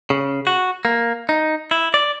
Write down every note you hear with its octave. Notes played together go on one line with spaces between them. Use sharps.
C#3
F#4
A#3
D#4
E4
D5